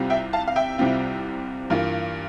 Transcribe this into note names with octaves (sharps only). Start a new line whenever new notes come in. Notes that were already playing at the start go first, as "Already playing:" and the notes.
Already playing: C2 C3 G3 C4 F4
E5 G5
F5 A5
F5
E5 G5
C2 C3 G3 C4 F4
G2 E3 A#3 F4